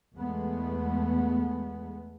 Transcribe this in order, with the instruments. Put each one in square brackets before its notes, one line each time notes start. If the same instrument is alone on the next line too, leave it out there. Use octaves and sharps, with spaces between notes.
[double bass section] E2 G#3 A3 B3